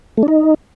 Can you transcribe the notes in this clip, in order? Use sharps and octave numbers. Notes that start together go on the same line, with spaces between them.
A3
D4
D#4